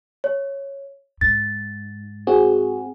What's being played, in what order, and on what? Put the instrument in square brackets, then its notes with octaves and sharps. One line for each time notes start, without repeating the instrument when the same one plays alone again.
[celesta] C#5
[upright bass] G#2 [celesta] A6
[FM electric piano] C4 F#4 G#4